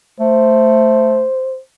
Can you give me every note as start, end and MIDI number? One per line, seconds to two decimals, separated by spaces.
0.20 1.24 57
0.20 1.60 72